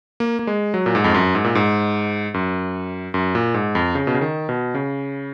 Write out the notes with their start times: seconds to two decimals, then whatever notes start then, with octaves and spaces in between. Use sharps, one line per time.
0.20 A#3
0.39 A#3
0.47 G#3
0.74 F#3
0.86 A#2
0.95 G#2
1.04 F2
1.14 F#2
1.35 G#2
1.44 A#2
1.55 G#2
2.34 F#2
3.14 F#2
3.35 A#2
3.54 G#2
3.75 F2
3.95 C#3
4.07 B2
4.15 C#3
4.21 D#3
4.49 B2
4.75 C#3